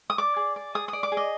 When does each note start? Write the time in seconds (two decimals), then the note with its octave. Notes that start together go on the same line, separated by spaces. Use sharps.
0.10 D#6
0.18 D5 D6
0.36 G#4
0.56 D5
0.75 G#4 D#6
0.88 D#6
0.93 D5
1.03 D6
1.12 G#4
1.17 D#5